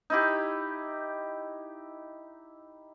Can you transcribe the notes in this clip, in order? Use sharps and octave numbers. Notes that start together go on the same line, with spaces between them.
D#4 E4 G4